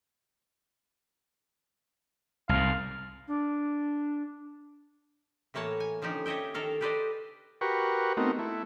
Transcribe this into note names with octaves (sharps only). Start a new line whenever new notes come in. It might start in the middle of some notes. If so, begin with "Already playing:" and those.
C2 G#2 F5
D4
A2 E3 A#3 C#5 A5
G#5
D3 F3 C#4 D#4 G4
G4 C#5 D#5 E5 G5
D#3 A4 A#4 F5
G4 A4 B4 C5 D5 D#5
F#4 G4 A#4 B4 C#6
A3 B3 C4 D#4 F#4 A#4
A3 E4